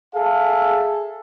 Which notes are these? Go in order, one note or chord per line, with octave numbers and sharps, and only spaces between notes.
G#4 A4 E5 F5 A5